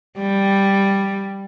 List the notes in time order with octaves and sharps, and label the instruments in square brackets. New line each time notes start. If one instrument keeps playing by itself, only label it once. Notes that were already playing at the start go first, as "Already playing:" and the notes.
[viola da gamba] G3